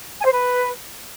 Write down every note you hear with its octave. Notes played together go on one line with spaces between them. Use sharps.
G#5
C5
B4